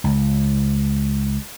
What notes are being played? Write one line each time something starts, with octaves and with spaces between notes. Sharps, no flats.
C#2